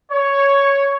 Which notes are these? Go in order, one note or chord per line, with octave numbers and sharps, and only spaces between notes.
C#5